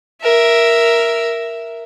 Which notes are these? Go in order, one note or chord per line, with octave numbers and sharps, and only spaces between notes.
A#4 E5